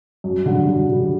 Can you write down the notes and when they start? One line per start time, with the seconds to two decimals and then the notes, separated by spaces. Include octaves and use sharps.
0.24 F#2
0.46 D3 G3
0.68 F#2
0.90 D3 G3